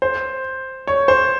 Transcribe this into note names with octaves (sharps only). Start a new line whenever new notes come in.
C5
C#5
C5